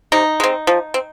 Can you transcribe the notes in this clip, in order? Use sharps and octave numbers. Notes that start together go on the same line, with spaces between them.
C3 D#4
G#3 C4
F3
C4